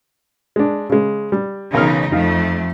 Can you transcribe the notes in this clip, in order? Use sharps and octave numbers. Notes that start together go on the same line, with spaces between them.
G#3 D4
C#3 G#3
G3
B1 C#3 E3 D#4 A#4 F6
F2 A3 D#4 F5